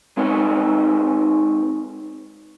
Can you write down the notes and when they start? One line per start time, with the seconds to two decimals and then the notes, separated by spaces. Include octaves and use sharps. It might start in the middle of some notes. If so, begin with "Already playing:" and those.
0.17 G#3 C4 D#4 B4 C#5